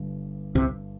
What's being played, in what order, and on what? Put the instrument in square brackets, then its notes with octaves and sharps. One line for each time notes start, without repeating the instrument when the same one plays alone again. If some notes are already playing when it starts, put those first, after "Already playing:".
Already playing: [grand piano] G1 G2 D3
[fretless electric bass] C2 C3